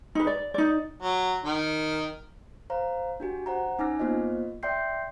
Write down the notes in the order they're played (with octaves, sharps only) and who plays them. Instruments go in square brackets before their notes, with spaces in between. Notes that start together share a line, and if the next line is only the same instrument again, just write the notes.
[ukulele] D#4 B4
D5
D#4 D5
[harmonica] F#3
D#3
[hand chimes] C5 F5 A#5
D4 F#4 G4 G#5
C5 F#5 A#5
C#4 D#4 G#5 D6 F6 A#6
A#3 B3 F4 C5 D#5
D5 E5 G5 C6 G6 C7